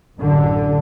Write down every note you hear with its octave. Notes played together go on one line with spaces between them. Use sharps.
A1 F#2 D3